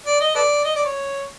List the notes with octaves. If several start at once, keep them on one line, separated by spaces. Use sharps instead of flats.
D5
D#5
A4 B4 D5
D#5
D5
C#5